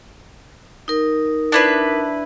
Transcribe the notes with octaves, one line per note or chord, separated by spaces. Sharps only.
D#4 A#4
D4 E4 B4